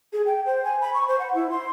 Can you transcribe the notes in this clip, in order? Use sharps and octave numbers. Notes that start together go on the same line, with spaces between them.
G#4
G5
C5
G#5
B5
C#6
C5
F#5
E4
C6